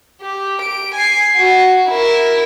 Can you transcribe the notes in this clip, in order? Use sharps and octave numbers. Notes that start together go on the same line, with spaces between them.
G4
D7
G#5 C7
F#4
E4 A#4